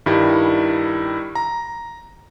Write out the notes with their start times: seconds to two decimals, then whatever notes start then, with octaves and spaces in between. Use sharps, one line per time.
0.06 G2 D#3 G3 E4
1.35 A#5